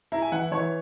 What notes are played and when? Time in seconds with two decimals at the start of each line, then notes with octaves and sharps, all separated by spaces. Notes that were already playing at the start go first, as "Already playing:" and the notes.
0.12 E4 A#5
0.22 G#5
0.32 E3 F#5
0.51 E3 C#5